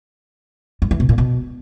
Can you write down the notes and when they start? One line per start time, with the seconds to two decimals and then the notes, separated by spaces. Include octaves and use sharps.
0.82 G2
0.91 E3
1.00 B2
1.09 A#2
1.18 B2